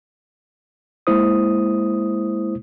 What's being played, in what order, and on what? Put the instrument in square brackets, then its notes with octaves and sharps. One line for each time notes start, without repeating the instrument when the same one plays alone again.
[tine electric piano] G#3 A#3 E4 C5 D#6